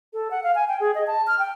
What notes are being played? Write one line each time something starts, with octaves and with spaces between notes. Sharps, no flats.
A4
F#5
F5
G#5
G5
G#4
D#5
A5
F6
G5